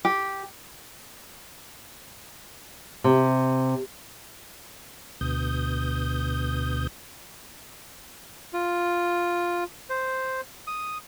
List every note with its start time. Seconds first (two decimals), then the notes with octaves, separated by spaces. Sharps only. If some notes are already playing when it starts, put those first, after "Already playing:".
0.05 G4
3.04 C3
5.21 D2 B2 D#6 G6
8.53 F4
9.90 C5
10.67 D#6